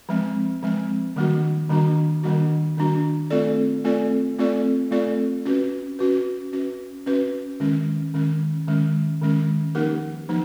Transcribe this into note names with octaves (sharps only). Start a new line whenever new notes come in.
F3 G#3 C4
F3 G#3 C4
D#3 G3 A#3 D4 F#4
D#3 G3 A#3 D4 F#4
D#3 G3 A#3 D4 F#4
D#3 G3 A#3 D4 F#4
A3 C4 F4 A4 D5
A3 C4 F4 A4 D5
A3 C4 F4 A4 D5
A3 C4 F4 A4 D5
C#4 F#4 B4
C#4 F#4 B4
C#4 F#4 B4
C#4 F#4 B4
D#3 G#3 C#4
D#3 G#3 C#4
D#3 G#3 C#4
D#3 G#3 C#4
F3 A#3 D#4 G4 A#4
F3 A#3 D#4